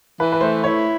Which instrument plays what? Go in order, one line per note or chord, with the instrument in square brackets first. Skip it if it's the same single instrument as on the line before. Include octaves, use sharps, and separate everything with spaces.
[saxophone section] E3 [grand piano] B4
[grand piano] B4
[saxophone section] A3 [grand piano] C5
[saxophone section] E4 [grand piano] C#5